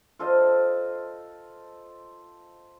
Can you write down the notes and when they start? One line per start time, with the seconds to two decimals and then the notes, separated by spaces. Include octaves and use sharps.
0.19 F4 A4 C5 D#5